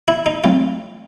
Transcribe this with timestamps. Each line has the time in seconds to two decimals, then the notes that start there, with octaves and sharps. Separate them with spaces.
0.08 E4
0.26 D#4
0.44 F#3 A3 C4 E4 F4